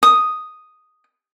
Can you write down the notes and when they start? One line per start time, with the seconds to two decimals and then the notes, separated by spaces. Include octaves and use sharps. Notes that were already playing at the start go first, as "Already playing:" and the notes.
0.03 D#6